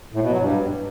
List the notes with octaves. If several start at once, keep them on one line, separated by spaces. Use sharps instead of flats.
A2
B2
F#3
G2